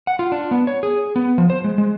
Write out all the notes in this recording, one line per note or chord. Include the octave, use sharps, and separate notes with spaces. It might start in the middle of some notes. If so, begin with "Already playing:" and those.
F#5
F4
D4
B3
C#5
G#4
B3
F3
C5
G#3
G#3